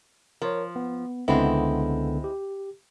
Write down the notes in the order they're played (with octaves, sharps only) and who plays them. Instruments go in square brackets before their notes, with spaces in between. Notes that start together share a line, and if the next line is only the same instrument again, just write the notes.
[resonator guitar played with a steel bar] F3 [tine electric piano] A#4 C#5
[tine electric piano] B3
[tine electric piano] C#2 D3 B3 [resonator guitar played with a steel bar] G#3 C4 E4
[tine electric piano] G4